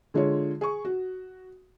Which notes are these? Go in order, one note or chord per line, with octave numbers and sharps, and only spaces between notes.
D3 G#3 F4 C#5
G#4 C#6
F#4